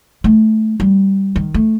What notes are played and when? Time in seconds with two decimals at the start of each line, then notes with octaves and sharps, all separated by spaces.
0.24 A3
0.80 G3
1.36 D#3
1.54 A3